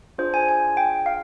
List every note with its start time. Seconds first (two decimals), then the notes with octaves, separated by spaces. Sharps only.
0.18 D4 F4 G#4 C5
0.34 G#5
0.49 G#5
0.77 G5
1.06 F5